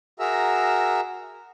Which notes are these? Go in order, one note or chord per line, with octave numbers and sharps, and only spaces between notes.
F#4 G#4 A#4 E5 A#5 E6